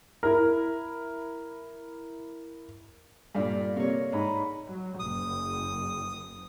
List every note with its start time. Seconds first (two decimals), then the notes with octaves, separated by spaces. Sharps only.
0.23 E4 A#4
3.35 G2 A#2 A4 D5 F5
3.76 C3 A#3 C#5 F5
4.13 G#2 D#5 A#5 B5
4.67 F#3
4.99 F#1 D#6